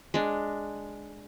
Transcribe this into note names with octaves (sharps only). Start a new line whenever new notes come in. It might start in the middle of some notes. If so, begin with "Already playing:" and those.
G#3 D4